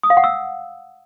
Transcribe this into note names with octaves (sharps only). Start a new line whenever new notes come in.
D#6
F5
F#5
E6